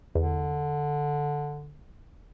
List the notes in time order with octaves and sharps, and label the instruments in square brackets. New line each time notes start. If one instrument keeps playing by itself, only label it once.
[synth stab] E2 [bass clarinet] D3